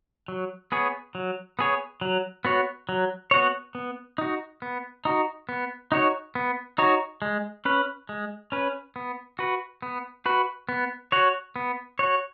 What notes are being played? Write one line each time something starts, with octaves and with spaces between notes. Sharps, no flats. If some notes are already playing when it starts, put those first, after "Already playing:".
F#3
B3 G#4 C#5
F#3
B3 G#4 C#5
F#3
B3 F#4 C#5
F#3
B3 F#4 C#5
B3
D#4 F#4
B3
D#4 F#4
B3
D#4 F#4 C#5
B3
D#4 F#4 C#5
G#3
C#4 B4
G#3
C#4 B4
B3
F#4 B4
B3
F#4 B4
B3
F#4 C#5
B3
F#4 C#5